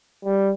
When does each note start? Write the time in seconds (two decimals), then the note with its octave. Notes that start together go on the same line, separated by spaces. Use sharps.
0.24 G3